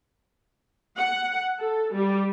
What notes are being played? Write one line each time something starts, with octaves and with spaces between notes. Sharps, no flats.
F#5
A4
G3